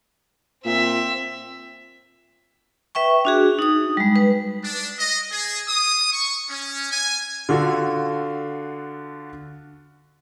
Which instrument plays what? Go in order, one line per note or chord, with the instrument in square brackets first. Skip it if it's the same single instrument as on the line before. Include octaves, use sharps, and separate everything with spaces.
[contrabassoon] A#2 [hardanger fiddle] C4 E5
[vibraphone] B4 E5 G5 C#6
D4 F#4 G#4
D#4 D#6
G3 G#3
B4
[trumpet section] D4
D#5
G#4
D#6
C#6
C#4
G#5
[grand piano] D3 F4 F#4 A4